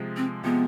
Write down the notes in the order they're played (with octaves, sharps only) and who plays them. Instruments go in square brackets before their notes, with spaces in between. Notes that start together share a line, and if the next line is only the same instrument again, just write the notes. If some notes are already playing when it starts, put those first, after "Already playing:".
Already playing: [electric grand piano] C3 F3 G#3
[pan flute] C4
[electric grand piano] C3 F3 G#3 [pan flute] B3